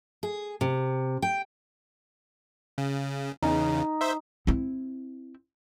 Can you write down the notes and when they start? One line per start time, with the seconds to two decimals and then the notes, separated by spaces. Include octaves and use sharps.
0.23 G#4
0.61 C3
1.22 G5
2.78 C#3
3.43 E2 C#3 D#4
4.01 C5 E5
4.47 C4 E4